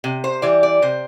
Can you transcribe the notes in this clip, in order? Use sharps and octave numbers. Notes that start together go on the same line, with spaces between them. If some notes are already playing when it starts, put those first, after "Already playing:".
C3
C5
E3 G3 D5
D5
C3 C5